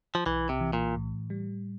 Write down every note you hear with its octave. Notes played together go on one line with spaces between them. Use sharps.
F3
B1 E3
C3
E3
A#2
A2
G3